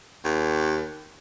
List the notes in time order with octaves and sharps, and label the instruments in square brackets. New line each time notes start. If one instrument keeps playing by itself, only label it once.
[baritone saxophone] D#2